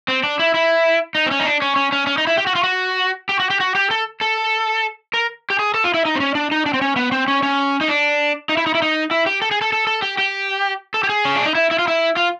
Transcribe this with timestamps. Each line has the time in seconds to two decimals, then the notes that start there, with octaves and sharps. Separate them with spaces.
0.08 C4
0.24 D4
0.39 E4
0.54 E4
1.15 D#4
1.26 C4
1.31 C#4
1.40 D#4
1.45 D4
1.62 C#4
1.76 C#4
1.92 C#4
2.07 C#4
2.18 D#4
2.27 E4
2.37 G4
2.47 F#4
2.55 F4
2.64 F#4
3.29 G4
3.40 F#4
3.50 G4
3.60 F#4
3.75 G4
3.91 A4
4.21 A4
5.14 A#4
5.50 G4
5.59 G#4
5.74 A4
5.84 F4
5.94 E4
6.05 D#4
6.16 C4
6.20 C#4
6.35 D4
6.51 D#4
6.66 D4
6.74 C4
6.81 C#4
6.96 B3
7.12 C4
7.28 C#4
7.43 C#4
7.81 D#4
7.88 D4
8.49 D#4
8.57 E4
8.67 D#4
8.75 E4
8.82 D#4
9.11 E4
9.26 G4
9.42 A4
9.51 G#4
9.61 A4
9.73 A4
9.87 A4
10.02 G4
10.18 G4
10.94 A4
11.03 G4
11.09 G#4
11.25 C#4
11.35 D4
11.46 D#4
11.55 E4
11.71 E4
11.79 F4
11.88 E4
12.16 F4